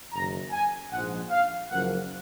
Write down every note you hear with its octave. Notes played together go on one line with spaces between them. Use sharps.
F#1 F#2 D#3 A#5
G#5
A#1 G#2 F3 G#3 F#5
F5
F#1 F#2 F3 A#3 F#5